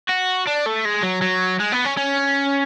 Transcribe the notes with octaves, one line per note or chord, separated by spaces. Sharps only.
F#4
D4
A3
G#3
F#3
F#3
G#3
B3
C#4
C#4